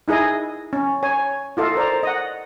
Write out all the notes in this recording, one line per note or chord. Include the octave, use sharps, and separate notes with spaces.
D#4 E4 G#4 D#5 G#5
C#4
C#5 G#5
E4 F4 A4 D#5
A#4 C5 D5 A#5
D#5 F#5